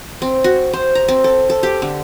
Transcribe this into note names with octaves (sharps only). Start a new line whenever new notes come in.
C4
F#4
C5
A#5
C4
A4
A4
G4
D3